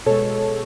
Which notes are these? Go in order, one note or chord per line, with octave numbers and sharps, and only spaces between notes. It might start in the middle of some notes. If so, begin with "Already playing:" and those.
B2 G#3 A4 C#5